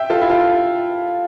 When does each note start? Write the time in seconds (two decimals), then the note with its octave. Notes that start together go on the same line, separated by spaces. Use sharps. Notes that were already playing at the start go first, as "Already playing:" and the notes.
Already playing: E5 G5
0.10 F4 A4
0.21 E4
0.30 F4